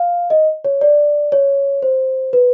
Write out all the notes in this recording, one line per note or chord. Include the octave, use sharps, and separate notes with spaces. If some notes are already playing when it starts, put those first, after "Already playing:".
Already playing: F5
D#5
C#5
D5
C#5
C5
B4